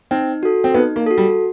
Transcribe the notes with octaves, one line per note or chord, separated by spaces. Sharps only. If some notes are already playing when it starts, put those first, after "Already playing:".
C4 D#4
F#4 A4
C4
B3 D#4
A#3
F#4 A4
G3